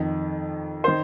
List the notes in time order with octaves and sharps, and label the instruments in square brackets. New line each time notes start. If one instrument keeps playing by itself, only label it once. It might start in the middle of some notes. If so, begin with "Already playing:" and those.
Already playing: [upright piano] F2 D#3
D#3 C5